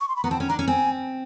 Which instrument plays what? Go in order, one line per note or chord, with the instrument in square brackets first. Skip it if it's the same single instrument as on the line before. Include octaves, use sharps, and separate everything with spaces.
[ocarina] C#6
C6
B5
[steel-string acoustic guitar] B3 [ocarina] A#5
[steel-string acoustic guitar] C4 [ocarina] A5
[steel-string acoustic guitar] C#4
[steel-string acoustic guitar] D4 [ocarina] A#5
[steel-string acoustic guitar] C#4
[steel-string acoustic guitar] C4 [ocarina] G#5